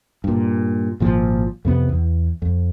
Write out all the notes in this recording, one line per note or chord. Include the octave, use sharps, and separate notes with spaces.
G2 A#2
G#1 A#2 F3
F2 C3 B3
E2
F2